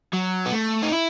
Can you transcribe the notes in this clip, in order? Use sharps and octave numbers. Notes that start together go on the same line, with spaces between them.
F#3
B3
A3
D#4
E4